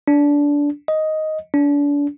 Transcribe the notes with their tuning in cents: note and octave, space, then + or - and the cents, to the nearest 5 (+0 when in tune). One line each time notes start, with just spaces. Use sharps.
D4 -20
D#5 +5
D4 -35